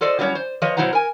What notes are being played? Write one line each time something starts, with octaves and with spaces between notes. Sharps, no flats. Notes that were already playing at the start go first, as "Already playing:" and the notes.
F4 A4 C5 D5 D#5
F#3 G3 A3 C#4 E4 C#5
C5
F3 B4 C#5 D#5
B2 F#3 E4 C5 F#5 A#5
A#4 G#5